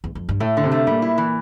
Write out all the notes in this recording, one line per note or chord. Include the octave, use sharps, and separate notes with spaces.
E2
F2
G2
A2 A3
D3
C3
A3
A#2 G3
E4
E3